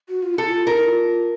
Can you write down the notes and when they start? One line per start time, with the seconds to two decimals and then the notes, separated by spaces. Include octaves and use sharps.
0.09 F#4
0.23 F4
0.34 E4 A4
0.48 F4
0.67 E4 A#4
0.77 E4
0.86 F4